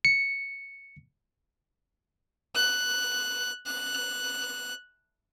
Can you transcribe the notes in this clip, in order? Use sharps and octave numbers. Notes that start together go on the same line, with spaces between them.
C#7
F#6
F#6